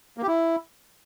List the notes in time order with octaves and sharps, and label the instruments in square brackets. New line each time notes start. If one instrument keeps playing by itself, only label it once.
[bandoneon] A#3
G4
E4